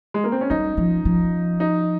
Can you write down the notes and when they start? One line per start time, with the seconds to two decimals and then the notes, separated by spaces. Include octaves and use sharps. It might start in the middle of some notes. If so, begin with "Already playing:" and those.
0.14 G#3
0.24 A#3
0.32 C4
0.41 C#4
0.50 G3 D#4
0.77 F3
1.05 F3
1.60 D#4